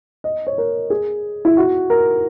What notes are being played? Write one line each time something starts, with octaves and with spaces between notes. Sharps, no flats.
D#5
C#5
A#4
G#4
E4
F#4
A#4